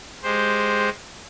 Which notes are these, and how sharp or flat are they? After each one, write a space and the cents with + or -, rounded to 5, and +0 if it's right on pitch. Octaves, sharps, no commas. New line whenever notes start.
G#3 +0 G4 +0 C5 +0